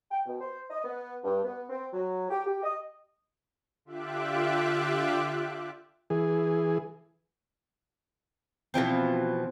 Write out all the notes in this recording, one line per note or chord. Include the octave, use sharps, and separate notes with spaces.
G5
B2
C5
D#5
B3
G2
B3
C4
F#3
G4
G4
D#5
D3 F4 G4 E5 D6 F#6
E3 G#4
B2 E3 F3 C4